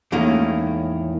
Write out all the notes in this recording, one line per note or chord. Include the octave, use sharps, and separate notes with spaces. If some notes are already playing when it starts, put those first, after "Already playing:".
E2 A2 D#3 G#3 A#3 C#4